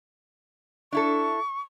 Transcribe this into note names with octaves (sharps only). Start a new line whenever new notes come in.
D4 E4 A4 C#6